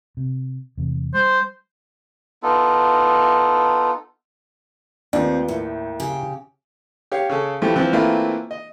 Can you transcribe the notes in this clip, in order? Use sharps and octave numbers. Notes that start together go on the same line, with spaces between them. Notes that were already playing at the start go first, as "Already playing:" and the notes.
C3
E2 C3
G3 C5
B3 D#4 F4 A4
D#2 A3 C4 F4 B4 D5
A2 E4 A#4
C#3 G4
G4 C#5 F5
C#3 C#4 A4
E3 F3 A3 E4 G4
E3 F3 C4
E3 A3 A#3 C4 E4 F4
D#5